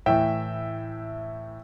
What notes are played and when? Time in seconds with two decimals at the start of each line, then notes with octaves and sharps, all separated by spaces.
0.06 A2 E3 E5 G5